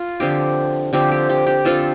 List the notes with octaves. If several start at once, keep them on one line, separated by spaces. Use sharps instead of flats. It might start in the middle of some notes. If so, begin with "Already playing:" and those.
Already playing: F4
D3 F3 C4 G4
D3 F3 C4 G4
G4
G4
G4
D3 F3 C4 F4 A4